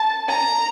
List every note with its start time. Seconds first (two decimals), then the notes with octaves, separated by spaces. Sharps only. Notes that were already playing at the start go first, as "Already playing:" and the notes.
Already playing: A5
0.28 A#5